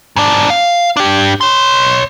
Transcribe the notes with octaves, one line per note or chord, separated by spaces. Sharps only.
G#2 D4
F5
D4 G4
C#5 C6